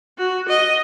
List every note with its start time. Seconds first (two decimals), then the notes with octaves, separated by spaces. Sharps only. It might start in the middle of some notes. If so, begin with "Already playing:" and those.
0.18 F#4
0.48 D#5